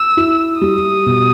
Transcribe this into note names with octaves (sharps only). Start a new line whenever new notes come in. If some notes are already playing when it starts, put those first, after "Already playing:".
Already playing: E6
E4
G3 D#6
B2